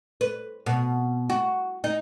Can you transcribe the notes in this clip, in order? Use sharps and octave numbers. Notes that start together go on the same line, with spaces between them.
B4
B2
F#4
D#4